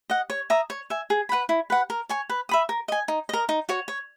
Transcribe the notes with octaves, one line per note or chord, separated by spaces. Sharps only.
D#5 F#5
C#5
E5 A#5 D#6
C#5
E5 G#5
G#4
B4 F#5 B5
E4
B4 F#5
A#4
C#5 G#5 C#6
B4
E5 B5 D#6
A#4
D#5 G#5
D#4
A#4 D#5
D#4
F#4 C#5
C#5